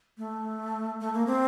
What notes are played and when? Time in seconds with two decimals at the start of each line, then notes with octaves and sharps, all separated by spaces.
0.18 A3
1.00 A3
1.13 A#3
1.27 C4